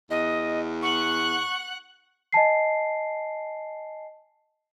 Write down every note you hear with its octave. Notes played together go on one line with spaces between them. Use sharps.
E2 D#5
F#5 C#6 F#6
D#5 G#5 A5 C7